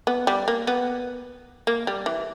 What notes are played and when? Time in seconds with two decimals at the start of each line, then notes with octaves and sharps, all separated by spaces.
0.07 B3
0.27 G3
0.48 A#3
0.67 B3
1.67 A#3
1.87 G3
2.06 E3